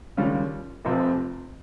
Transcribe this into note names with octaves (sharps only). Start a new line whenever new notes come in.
D#2 C#3 G3 C#4 F4
F1 F2 C3 F3